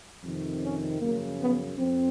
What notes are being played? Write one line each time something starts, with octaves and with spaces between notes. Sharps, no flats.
F2 C3 D#3
C#4
F#2 C#3 F3 A#3
B3
F2 C4